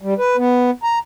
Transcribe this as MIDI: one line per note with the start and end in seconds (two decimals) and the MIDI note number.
0.01 0.14 55
0.18 0.36 71
0.37 0.71 59
0.83 0.99 82